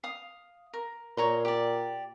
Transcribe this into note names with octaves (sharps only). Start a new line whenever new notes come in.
F5 D#6
A#4
A#2 C#5 A#5 C6
G4 D5